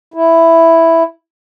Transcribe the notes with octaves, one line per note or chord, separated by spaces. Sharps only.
E4